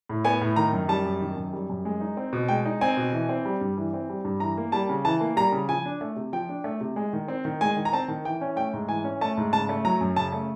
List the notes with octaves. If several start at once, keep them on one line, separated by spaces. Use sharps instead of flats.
A2
B3 G#5
A2
D#3 A#5
F#2
G3 A5
F#2
D#3
F#2
G3
F#2
G#3
D#4
C4
B2
G#3 G5
D#4
C4 G#5
B2
E3
C4
G3
G2
E3
C4
G3
G2
E3 A#5
A#3
G3 A5
C#3
E3 A5
A#3
G3 A#5
C#3
F3 G#5
D4
A3
C3
F3 G5
D4
A3
C3
G#3
D#3
C4
D#3
G#3 G#5
D#3
A#5
C4 A5
D#3
E3 G5
C#4
A3 G5
G#2
E3 G#5
C#4
A3 A5
G#2
C#3 A5
A3
F#3 A#5
F#2
C#3 A5
A3